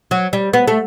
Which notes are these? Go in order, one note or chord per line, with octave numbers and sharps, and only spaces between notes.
F#3
G3
B3
A3